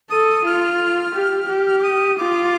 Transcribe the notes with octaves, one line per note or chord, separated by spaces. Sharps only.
A4 D#6
F4 F6
G4
G4
F6
D6
D#6
F4 D6